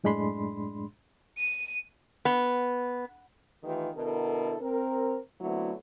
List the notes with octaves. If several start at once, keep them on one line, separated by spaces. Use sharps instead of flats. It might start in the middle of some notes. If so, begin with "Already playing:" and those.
F#2 A2 G#3 D4 B5 C6
D#7
B3
D#3 E3 A3 F4 G4 B4
B2 D3 E4 A4 A#4
C4 A#4
D3 F#3 A3 B3 C4 E4